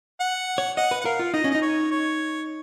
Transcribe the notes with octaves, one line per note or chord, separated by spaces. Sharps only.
F#5
C#5
D#5 F#5
B4
F#5
A#4 F5
F4
D#4 D#5
C#4
D#4 D#5
C#5
C#5